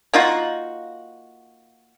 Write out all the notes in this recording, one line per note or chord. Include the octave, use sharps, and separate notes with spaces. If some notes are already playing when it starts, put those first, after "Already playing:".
A#3 D#4 F4 F#4